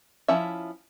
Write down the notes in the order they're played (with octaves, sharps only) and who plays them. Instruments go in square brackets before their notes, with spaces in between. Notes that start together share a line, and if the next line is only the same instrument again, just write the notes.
[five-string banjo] F3 C#4 E4 E5